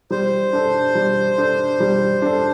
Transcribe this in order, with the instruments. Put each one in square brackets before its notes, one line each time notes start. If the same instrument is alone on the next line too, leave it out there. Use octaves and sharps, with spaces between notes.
[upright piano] G3 [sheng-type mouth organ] C5
[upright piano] D4 A4
G3
D4 A4
G3
D4 A4